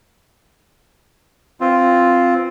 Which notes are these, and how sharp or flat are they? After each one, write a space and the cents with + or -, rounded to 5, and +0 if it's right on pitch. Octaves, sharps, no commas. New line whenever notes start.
E3 -15 C4 +0 F4 +0